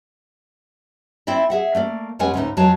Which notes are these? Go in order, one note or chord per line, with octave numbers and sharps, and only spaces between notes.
C4 E4 D5 E5
G#4 E5 F#5
A3 A#3 D5
F2 G3 G#3 C#4 F#5 G#5
D2 A2 D3 D#4
F2 F#3 G#3 C#5 F5 A5